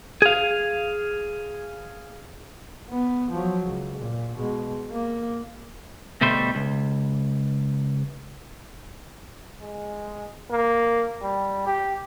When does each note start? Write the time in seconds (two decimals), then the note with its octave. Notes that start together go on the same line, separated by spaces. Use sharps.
0.22 G#4 F5
2.90 B3
3.31 F3 F#3
3.66 C#2
3.98 A#2
4.36 B2 G#3
4.92 A#3
6.21 D2 B2 G3 A3 C5
6.55 C#2
9.61 G#3
10.50 A#3
11.22 G3
11.67 G4